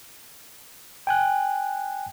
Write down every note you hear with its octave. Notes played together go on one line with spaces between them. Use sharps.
G5 G#5 F#6